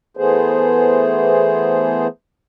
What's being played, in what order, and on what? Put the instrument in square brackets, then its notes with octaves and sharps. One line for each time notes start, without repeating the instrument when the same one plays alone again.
[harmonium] E3 A3 B3 G#4 C5